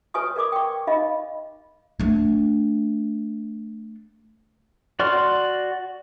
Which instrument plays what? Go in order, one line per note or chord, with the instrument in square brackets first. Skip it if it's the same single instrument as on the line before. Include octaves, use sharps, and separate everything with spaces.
[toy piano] B4 C#5 G#5 C#6 D#6
A#4 D5 D6 D#6
G5 C#6
D#4 D#5 F5 B5
[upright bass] A3 D4
[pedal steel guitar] F#4 D5 C6 C#6 F6